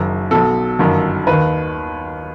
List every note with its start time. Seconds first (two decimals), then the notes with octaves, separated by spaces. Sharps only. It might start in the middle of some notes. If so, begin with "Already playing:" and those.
Already playing: F#1 F#2 D#3
0.31 B1 B2 A4
0.79 G1 F#2 D#3
1.27 D#2 D#3 B4